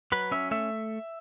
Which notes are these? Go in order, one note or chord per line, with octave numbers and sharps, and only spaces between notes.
F#3 B4
C#4 E5
A3 E5